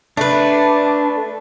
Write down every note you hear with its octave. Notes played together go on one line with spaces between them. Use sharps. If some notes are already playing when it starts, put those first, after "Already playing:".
A3 D4 B4